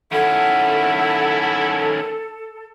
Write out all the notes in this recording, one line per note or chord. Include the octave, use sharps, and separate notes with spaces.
D#3 C#4 E4 A4 F#5